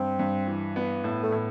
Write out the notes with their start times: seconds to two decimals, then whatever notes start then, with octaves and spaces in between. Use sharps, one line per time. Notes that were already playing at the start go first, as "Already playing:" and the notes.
Already playing: G2 C4
0.19 G2
0.47 E3
0.76 B3
1.04 A2
1.23 A3
1.32 A2